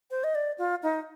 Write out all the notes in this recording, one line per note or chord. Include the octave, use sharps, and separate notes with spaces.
C5
D#5
D5
F4
D#4